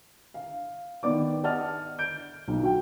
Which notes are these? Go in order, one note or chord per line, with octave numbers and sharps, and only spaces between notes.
F5
D#3 B3 D5 D6
D5 D#5 F#5 A5 F6 A6
G6 D7
B1
F#4 G5